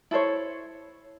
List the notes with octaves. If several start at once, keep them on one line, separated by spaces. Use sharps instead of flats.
E4 A4 C5 C#5